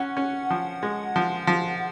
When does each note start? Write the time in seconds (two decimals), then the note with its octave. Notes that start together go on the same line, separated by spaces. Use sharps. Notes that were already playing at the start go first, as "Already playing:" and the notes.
Already playing: C#4 F#5
0.17 C#4
0.50 F3
0.83 G#3
1.16 F3
1.47 F3